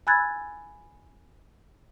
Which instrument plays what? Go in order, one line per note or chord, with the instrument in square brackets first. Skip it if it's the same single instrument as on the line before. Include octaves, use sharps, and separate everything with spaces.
[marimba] G#5 B5 E6 F#6 G#6 A6